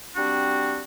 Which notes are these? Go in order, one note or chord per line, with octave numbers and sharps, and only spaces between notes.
G3 C4 D4 F#4